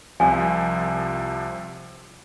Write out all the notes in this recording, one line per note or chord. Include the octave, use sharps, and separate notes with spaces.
C2 C3 F3 F5 G#5